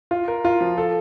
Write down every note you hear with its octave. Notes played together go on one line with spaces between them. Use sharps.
F4
A#4
F4
F3
A4